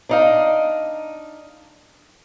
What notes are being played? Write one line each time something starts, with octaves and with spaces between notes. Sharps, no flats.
D4 D#4 F5